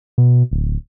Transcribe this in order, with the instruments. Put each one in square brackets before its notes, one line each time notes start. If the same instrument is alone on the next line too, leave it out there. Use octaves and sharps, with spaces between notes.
[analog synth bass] B2
D1